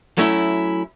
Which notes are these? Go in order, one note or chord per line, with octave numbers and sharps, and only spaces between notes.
F#3 A3 C#4 E4